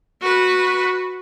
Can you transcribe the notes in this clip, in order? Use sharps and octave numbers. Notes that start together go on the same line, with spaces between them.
F#4 B4